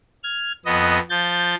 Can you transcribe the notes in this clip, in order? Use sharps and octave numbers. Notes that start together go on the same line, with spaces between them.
F6 G#6
F2 B3 D#5
F3 G6 A6